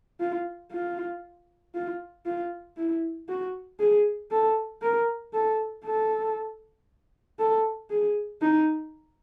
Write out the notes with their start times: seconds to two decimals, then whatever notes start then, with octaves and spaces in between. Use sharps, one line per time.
0.20 F4
0.72 F4
1.74 F4
2.26 F4
2.77 E4
3.29 F#4
3.79 G#4
4.31 A4
4.82 A#4
5.33 A4
5.85 A4
7.39 A4
7.90 G#4
8.41 D#4